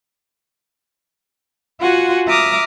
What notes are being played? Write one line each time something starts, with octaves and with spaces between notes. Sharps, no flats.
F4 F#4 F#5 G#5
E5 A#5 D6 D#6 F6